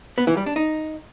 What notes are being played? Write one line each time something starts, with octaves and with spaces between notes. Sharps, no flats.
B3
E3
G3
D4
D#4